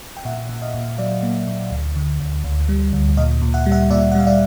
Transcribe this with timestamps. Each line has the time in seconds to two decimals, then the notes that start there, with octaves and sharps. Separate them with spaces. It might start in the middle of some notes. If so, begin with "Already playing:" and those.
0.17 G5
0.25 A#2 E5 F#5
0.49 A#2
0.62 D#5 F5
0.74 A#2
0.98 F#3 D5 E5
1.23 A#3
1.47 A#2
1.71 D2
1.96 D3
2.20 D2
2.44 D2
2.69 G3
2.93 D2
3.17 A#2 D#5 F5
3.42 A#2
3.54 E5 F#5
3.66 G3
3.72 E5 F#5
3.90 A#2 D5 E5
4.12 F#5
4.15 G3 F5
4.27 D5 E5